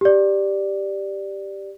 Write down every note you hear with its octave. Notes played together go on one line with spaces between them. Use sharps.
G4 D5